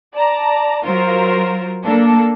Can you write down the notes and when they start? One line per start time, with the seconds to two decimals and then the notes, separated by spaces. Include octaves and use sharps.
0.15 D5 A5 A#5
0.85 F#3 F4 A#4 C5
1.84 A#3 D4 A4